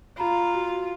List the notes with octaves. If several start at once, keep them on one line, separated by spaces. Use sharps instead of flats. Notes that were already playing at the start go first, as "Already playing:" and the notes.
F4 A#5 B5
F#4